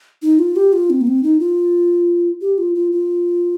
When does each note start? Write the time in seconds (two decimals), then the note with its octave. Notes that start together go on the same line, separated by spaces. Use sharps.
0.22 D#4
0.39 F4
0.56 G4
0.73 F4
0.90 C4
1.01 A#3
1.07 C4
1.23 D#4
1.40 F4
2.41 G4
2.58 F4
2.75 F4
2.92 F4